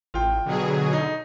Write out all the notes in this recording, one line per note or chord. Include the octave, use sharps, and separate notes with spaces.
A1 F4 G5
B2 D3 F#3 G#4
D#4